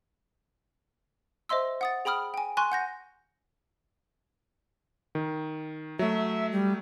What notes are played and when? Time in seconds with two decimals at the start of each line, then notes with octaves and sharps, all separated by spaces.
1.49 C5 D#5 E5 C6 E6
1.81 F#5 D#6 A6
2.05 G#4 G5 B5 D#6 F6
2.34 G5 G#5
2.57 G#5 C6 C#6 F#6
2.72 F#5 G6 A#6
5.15 D#3
5.99 F#3 A3 E5
6.52 G3